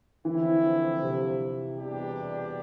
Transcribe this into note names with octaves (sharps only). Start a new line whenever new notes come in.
D3 E3 F3 C4 E4
C3
E2 B2 G3 D4 G4